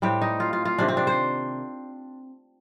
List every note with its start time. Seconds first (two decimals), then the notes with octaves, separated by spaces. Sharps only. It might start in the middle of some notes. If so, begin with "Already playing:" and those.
0.02 A2 G3 C4 G4
0.21 D#4
0.40 F4
0.53 F4
0.65 F4
0.78 C3 D#3 A#3 D4
0.88 C4
0.97 D4
1.07 C5